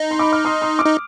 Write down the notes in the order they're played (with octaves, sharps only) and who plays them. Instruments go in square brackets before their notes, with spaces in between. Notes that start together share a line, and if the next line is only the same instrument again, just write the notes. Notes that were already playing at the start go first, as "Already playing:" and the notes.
Already playing: [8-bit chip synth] D#4
[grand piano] C6
B5 D6
D6 F6
C6 D#6
C6 D#6
D6 F6
[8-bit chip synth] D#4